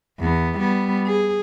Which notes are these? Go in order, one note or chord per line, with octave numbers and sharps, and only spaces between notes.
E2 B3
G3 B3
G#4